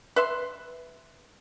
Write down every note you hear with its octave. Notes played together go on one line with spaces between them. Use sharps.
B4 E5 C6